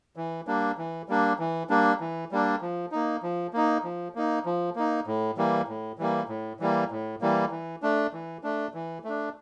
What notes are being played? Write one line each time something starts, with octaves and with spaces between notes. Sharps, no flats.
E3
G3 A#3 D4
E3
G3 A#3 D4
E3
G3 A#3 D4
E3
G3 A#3 D4
F3
A#3 D#4
F3
A#3 D#4
F3
A#3 D#4
F3
A#3 D#4
A2
E3 G3 A#3
A2
E3 G3 A#3
A2
E3 G3 A#3
A2
E3 G3 A#3
E3
A3 D4
E3
A3 D4
E3
A3 D4